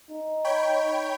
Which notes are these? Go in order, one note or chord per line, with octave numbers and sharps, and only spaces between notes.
D#4
C#5 G5 B5